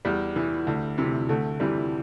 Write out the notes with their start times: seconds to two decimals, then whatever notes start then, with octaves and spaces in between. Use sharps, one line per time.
0.05 E2 G3
0.36 E3
0.67 D2
0.98 C3 E3
1.29 D2 A3
1.60 C3 E3 G3